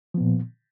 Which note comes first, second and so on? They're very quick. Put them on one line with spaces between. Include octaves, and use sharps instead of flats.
F3 B3 A#2